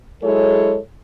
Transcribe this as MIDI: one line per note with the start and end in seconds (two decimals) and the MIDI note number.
0.23 0.79 54
0.23 0.79 56
0.23 0.79 64
0.23 0.79 68
0.23 0.79 69
0.23 0.79 73